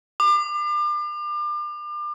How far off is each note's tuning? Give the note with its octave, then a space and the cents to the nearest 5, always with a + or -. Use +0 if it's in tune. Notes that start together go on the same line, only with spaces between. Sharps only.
D6 +35